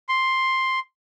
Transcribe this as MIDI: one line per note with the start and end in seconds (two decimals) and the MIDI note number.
0.09 0.79 84